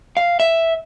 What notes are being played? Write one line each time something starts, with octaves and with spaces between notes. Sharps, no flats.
F5
E5